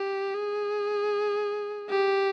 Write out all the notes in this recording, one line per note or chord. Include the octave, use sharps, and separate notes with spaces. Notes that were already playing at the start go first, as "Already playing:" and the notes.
Already playing: G4
G#4
G4